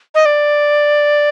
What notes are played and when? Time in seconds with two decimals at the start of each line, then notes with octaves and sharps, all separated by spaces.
0.15 D#5
0.26 D5